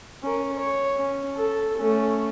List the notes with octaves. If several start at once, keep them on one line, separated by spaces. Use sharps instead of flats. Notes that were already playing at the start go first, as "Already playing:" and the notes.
C#4 A#4
C#5
C#4
A4
A3 C#4